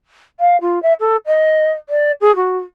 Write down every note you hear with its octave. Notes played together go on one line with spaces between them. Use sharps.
F5
F4
E5
A4
D#5
D5
G#4
F#4